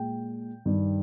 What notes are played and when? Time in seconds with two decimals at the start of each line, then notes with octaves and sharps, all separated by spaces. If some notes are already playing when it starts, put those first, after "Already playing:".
Already playing: A#2 G#3 G5
0.66 G2 D#3 G3